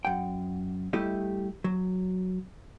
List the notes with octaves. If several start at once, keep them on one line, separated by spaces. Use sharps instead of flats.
F#2 F#5 G5
G3 A3 E4 G4 D#5
F#3